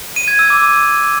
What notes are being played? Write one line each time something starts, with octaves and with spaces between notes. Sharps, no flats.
D#7
G#6
E6
D6